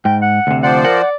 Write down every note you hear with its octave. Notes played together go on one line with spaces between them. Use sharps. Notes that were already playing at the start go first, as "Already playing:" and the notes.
G#2 G5
F#5
D2 C3
F3 C5 D5 F#5
A#4 F#5
D5